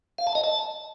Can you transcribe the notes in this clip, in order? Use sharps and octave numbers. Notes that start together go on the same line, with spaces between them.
F5
A5
D#5
A5